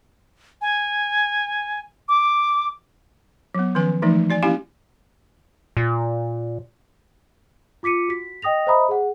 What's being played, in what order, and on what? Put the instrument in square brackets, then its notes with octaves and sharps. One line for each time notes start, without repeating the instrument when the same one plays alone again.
[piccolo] G#5
D6
[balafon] F#3 B3
D#3 F3 C#4 B4 G#5
E3 F3 G#3 A3 D#4
F#4 D5 G#5
A#3 C#4 E4 G4 F5 G#5
[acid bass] A#2
[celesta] F4 D6 B6 C#7 D#7
F#4 B6
D#5 G5 D#6 A#6 F7
C5 D#5 E5 A#5 B5 D#6
G#4 F#5